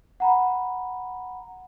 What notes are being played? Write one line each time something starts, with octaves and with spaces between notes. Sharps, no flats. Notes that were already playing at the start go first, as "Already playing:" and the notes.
F#5 A#5 B5